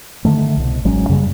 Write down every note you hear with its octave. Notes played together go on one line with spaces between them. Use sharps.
D3 D#3 A3
C2 B2
G#1 F#3 G#3 C#4
F#2 C#3 G3 A#3